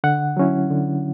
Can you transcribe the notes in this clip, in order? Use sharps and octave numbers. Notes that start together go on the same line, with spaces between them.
D3 F#5
F#3 C#4 E4
D3